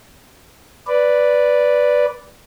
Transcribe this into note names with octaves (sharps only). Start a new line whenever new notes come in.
B4 D5